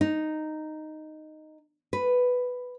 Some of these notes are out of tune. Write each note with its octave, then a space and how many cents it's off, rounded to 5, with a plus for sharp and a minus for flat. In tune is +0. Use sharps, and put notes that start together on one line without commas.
D#4 -5
B4 +5